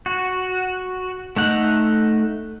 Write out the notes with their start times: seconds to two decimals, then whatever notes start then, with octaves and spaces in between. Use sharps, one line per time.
0.06 F#4
1.37 A3 D#4 F#5